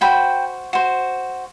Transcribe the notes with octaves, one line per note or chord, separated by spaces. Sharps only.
F#4 C5 G5 B5
F#4 C5